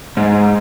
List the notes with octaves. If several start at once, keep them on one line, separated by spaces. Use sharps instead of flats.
G#2